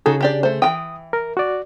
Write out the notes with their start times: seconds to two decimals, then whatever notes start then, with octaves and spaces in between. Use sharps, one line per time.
0.06 C#3 D#4 F#4 G#4 A4
0.21 D4 G4 D5
0.43 A3 C5
0.62 E3 F4 G5 D#6
1.13 A#4
1.37 F#4 D5